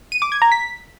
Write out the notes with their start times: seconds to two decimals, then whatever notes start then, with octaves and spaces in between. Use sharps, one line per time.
0.12 D#7
0.22 D6
0.32 G#6
0.42 A#5
0.52 B6